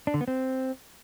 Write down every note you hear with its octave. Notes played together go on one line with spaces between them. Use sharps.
D4
D3
B3
C4